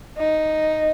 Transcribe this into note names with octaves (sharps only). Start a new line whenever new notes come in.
D#4